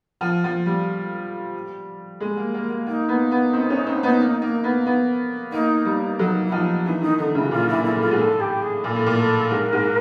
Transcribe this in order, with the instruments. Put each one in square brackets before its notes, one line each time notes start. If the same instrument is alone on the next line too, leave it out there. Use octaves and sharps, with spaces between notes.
[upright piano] F3
F3
G3
G#3
A#3
A#3
A#3
[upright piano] A#3 [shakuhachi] D#4
[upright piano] B3
B3
C4
C#4
C4
B3
A#3
A#3
B3
B3
[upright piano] A#3 [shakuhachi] D#4
[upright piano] G3
[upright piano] F#3 [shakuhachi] D#4
[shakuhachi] E4
[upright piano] F3 [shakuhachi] D#4
[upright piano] E3 [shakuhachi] D#4
[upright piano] D#3 [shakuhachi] D#4
[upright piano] D3 [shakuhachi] D#4
[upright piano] C#3 [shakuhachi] E4
[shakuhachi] F#4
[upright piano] A#2 [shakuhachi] F4
[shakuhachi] E4
[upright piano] A#2
[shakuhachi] E4
[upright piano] A2
[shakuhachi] F4
[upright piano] G#2
[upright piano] A2 [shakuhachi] A4
[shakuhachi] G4
G#4
[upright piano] A#2 [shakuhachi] A4
[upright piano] A2
[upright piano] A#2 [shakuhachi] A#4
[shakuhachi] A4
[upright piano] G#2 [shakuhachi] A#4
[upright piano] G#2